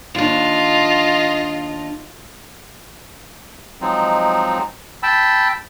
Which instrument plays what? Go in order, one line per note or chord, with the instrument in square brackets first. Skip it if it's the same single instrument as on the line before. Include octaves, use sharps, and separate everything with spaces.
[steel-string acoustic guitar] D#2 D4 [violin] F4 D#5
[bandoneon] F3 F#3 G#3 C4 D#4
G5 A5 B5 E6